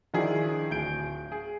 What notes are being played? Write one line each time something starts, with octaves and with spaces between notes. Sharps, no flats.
D#3 F3 D4 E4 G#4
D1 G6 D7
G#4